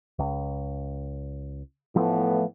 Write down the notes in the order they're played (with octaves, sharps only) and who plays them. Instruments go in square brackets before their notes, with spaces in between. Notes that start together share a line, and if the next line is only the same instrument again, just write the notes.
[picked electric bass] C#2
[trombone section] A2 E3 B3 [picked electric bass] F3 A3